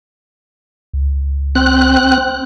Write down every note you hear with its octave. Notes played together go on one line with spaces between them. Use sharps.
C#2
C4 F#6